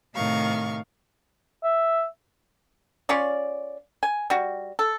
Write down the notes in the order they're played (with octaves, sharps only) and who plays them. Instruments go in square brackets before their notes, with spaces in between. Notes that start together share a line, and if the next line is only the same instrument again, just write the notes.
[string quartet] A2 C3 D#3 F5 C#6
[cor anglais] E5
[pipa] C#4 F4 C#5 D5
G#5
G3 F#4
A4